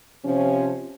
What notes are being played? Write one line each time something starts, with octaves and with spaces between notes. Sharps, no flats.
C3 F3 C#4